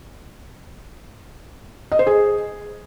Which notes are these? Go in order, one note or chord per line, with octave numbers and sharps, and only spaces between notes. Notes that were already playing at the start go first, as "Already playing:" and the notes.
D#5
C5
G#4